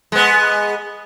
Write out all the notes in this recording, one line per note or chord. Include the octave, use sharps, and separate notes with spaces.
G#3 B3